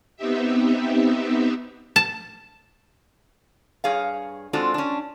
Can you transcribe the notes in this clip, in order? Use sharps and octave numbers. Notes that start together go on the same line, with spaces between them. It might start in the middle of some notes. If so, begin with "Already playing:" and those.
B3 C4 D#4 G4 E5
A5
G2 G#4 C#5 F5
G#3 C4 D4 F4 F#4 A4
C#4 D4